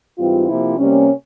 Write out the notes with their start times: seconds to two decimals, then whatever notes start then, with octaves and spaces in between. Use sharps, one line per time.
0.17 G#2 E3 G3 C4 F4
0.47 C3 F3 A#3 E4
0.78 C3 G3 A#3 C#4